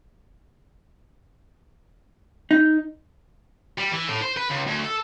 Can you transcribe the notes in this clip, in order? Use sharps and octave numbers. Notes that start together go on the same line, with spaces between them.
D#4
G3
E3
A2
C5
B4
C#2
D2
A4